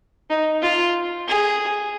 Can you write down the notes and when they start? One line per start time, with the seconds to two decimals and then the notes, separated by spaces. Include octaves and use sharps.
0.30 D#4
0.62 F4
1.28 G#4